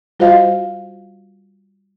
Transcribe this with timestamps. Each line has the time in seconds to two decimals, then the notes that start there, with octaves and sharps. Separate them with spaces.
0.20 G3 F4 F#4 C5 D#5 F5